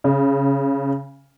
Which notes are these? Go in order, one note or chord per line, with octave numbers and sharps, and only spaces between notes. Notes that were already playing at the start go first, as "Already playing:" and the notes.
C#3